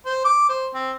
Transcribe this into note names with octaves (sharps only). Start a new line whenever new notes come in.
C5
D6
C5
C4